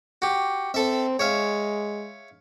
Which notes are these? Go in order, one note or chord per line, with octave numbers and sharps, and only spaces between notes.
F#4 G4
C4 A4 E5
G#3 C#5 E5 F5